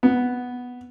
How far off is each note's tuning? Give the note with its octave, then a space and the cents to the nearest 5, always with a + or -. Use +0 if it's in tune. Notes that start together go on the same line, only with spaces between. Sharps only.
B3 +0